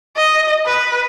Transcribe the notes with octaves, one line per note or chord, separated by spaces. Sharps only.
D#5
B4